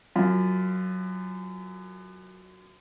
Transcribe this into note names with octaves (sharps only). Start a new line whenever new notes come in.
F#2 F4